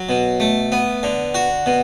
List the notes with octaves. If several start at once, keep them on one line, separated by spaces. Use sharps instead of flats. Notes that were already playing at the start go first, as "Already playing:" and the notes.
Already playing: F#3
B2
A3
B3
D3
F#4
B2